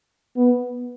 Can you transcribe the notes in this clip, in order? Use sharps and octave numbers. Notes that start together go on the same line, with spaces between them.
B3